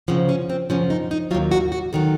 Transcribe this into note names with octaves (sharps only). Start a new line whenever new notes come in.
F#2 C#3 F3 C4
C#4
C4
F#2 C#3 F3 C#4
D#4
D#4
D#2 D#3 F#3 F4
F#4
F#4
D#3 F#3 A4